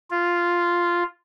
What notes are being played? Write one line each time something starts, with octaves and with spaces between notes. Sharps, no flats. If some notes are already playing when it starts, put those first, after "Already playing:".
F4